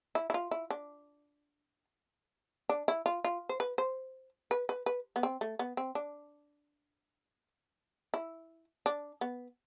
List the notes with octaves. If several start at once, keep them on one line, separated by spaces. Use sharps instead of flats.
E4
E4
F4
E4
D4
D4
E4
F4
F4
C5
B4
C5
B4
B4
B4
B3
C4
A3
B3
C4
D4
E4
D4
B3